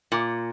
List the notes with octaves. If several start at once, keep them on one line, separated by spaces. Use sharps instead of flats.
A#2